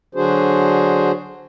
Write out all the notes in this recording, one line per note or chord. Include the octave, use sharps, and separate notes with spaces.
D3 F#3 D4 F#4 G#4 C5